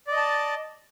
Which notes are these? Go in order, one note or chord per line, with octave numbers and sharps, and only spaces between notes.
D5 D#5 A5